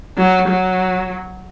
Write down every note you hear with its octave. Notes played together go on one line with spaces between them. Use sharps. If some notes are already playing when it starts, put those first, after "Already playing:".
F#3
F#3